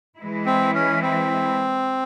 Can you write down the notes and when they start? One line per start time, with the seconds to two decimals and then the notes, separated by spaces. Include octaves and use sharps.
0.19 E3 G#3 E4
0.46 C4
0.74 C#4
1.02 C4